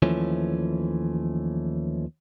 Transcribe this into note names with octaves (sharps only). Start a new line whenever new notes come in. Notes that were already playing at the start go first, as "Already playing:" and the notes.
D#2 E3 F3 A3 C#4